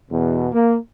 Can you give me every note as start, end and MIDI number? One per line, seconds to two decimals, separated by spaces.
0.10 0.48 40
0.10 0.48 47
0.53 0.76 58